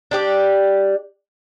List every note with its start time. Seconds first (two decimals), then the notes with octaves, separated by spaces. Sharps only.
0.11 D4 G4 D5